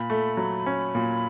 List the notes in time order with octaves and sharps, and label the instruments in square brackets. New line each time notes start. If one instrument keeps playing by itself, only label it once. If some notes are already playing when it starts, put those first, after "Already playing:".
Already playing: [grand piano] A#2 [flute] B5
[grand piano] A3
F#3
C#4
A#2